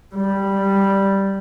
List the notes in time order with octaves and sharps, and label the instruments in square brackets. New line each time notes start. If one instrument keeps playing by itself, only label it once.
[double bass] G3